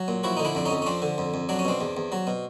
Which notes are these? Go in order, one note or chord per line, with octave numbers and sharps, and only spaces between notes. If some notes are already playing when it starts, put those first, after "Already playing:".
Already playing: F#3
A#2
F3 E4 F#4
D3 D#4
D4 E4
F2 D4
C#4 D#4
F2
C#4
F3 C4 D4
D3
F2
F2
F#3 D4
C#4
B2 C4 D4
E2
E2
F#3
B2